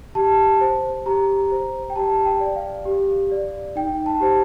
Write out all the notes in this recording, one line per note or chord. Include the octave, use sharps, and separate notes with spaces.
G4 A5
C5
G4 A#5
C5
G5
G4 A5
G5
D5
F5
G4
D5
D#4 G5
A5
G4 C5